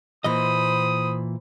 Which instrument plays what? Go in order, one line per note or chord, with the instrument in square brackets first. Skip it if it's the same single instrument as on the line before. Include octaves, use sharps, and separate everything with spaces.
[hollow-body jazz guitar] A#2 E3 D#5 [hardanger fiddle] C5 B5 [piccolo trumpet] D#6